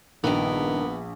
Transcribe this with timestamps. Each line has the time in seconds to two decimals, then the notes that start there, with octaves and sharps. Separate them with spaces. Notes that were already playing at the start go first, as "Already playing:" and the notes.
0.24 A#1 G2 D#3 B3 A#4